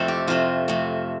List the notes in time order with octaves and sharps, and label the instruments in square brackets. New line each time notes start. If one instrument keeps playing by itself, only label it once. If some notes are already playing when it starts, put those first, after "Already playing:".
Already playing: [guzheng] F2 C3 A3 C4 A4 C5
G4
F2 C3 A3 F4
F2 C3 A3